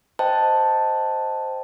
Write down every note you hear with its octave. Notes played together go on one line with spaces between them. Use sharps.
C5 D#5 G5 A5